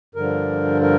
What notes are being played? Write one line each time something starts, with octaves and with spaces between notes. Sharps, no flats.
G2 D3 F3 A#4
A#4